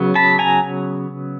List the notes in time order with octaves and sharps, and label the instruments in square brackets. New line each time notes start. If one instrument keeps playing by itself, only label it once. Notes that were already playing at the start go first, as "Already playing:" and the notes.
Already playing: [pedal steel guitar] C#3 F#3 B3
A5 B5
G#5 A#5